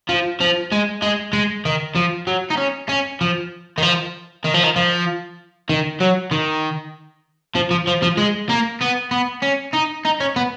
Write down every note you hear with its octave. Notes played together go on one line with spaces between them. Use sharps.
F3
F3
G#3
G#3
G#3
D#3
F3
F#3
D#4
C#4
C#4
F3
D#3
F3
D#3
F3
D#3
F3
D#3
F#3
D#3
F3
F3
F3
F3
G#3
A#3
B3
B3
C#4
D#4
D#4
C#4
B3